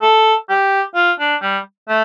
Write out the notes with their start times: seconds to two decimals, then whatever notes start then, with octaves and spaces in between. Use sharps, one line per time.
0.02 A4
0.49 G4
0.95 F4
1.19 D4
1.41 G3
1.88 A3